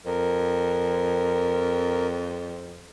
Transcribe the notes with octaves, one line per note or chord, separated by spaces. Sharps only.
F2 A#4